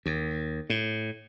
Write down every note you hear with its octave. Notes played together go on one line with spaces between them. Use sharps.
D#2
A2